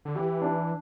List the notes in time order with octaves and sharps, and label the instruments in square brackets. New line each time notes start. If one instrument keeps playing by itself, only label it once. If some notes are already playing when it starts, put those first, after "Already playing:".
[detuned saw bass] D3
[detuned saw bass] E3 [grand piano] G4
[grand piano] D4